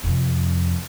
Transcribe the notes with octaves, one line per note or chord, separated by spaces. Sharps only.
F2 C3